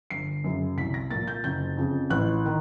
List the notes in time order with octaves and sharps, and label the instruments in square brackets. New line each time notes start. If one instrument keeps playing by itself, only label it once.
[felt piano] G1 C7
F#2 C#3
C2 B6
A#6
A#2 F3 A#3 A6
G6
F#1 G6
F2 C#3
A1 F#6
D#3